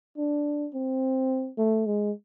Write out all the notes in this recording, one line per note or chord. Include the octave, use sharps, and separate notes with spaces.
D4
C4
A3
G#3